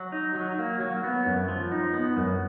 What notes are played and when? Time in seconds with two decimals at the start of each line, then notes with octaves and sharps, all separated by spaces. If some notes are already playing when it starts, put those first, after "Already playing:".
Already playing: F#3
0.12 D#4
0.35 F#3
0.58 A#3
0.81 F#3
1.04 B3
1.26 F#2
1.48 F3
1.72 D#4
1.94 B3
2.17 F#2